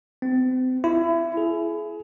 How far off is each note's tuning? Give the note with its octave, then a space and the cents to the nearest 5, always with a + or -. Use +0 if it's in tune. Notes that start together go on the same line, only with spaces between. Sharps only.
C4 -35
E4 +25
G#4 +30